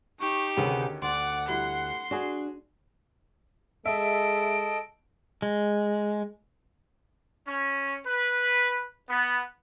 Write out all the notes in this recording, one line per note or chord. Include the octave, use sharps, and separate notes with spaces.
D#4 G4 C#6
D2 C3 D#3 C#4 G#4 B4 F#5
D2 D5 F#5 C6
G3 E4 C6
D4 F#4 G#4
G#3 A4 D#5 E5 D7
G#3
C#4
B4
B3